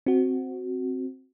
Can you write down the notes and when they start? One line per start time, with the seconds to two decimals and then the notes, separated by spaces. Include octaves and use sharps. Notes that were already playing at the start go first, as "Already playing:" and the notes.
0.06 C4 F#4